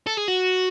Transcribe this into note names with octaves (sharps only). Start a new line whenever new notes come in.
A4
G#4
F#4